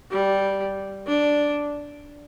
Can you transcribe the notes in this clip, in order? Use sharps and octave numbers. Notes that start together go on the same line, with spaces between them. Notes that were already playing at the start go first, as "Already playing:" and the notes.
G3
D4